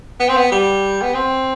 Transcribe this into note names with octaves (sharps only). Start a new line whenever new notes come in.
B3
C4
B3
G3
B3
C4